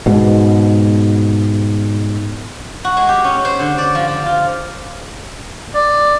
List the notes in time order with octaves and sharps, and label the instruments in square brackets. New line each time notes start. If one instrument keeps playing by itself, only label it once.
[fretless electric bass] G#2 B2
[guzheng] F#4
G#3
G4
C#4
C5
D3
D5
F3
F3
F4
[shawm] D5